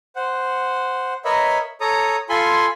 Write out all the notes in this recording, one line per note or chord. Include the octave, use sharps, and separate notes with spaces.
C5 F#5
A#4 B4 C#5 D#5 E5 B5
A4 C#5 A#5 D#6
F4 A4 G#5 B5 C6